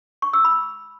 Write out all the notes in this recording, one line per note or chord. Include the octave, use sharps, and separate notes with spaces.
C#6
E6
B5